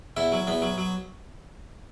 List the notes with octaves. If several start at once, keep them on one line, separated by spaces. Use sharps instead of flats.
E2 E4
F#3
E2 B3
F#3
F#3